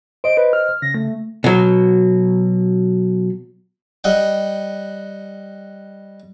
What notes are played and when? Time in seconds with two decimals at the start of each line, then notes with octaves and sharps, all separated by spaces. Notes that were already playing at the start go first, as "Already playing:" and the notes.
0.24 C5 D#5 D7
0.37 B4
0.53 F6
0.82 C#3 A#6
0.95 A3
1.44 B2 F#3
4.04 G3 D#5 F#5 G5